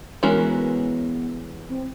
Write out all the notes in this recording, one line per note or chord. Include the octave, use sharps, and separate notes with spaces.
E3 G#3 B3 C#4 F#4 A#4
C4